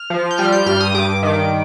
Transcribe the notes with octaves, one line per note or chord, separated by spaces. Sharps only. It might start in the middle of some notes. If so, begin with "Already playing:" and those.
Already playing: F6
F3
G6
G3 F6
G6
G2 F6
D#6
G2 D6
D#3